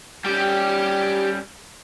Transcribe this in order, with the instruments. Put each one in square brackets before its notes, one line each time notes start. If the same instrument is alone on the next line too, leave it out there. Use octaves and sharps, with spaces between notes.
[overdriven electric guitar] G3 C#4 [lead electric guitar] G4 G5